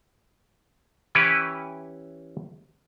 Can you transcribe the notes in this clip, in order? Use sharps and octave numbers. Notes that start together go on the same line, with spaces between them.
E3 C#4 E4 G4 B4